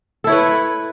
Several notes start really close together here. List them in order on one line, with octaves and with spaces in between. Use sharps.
A4 E4 C#5 B4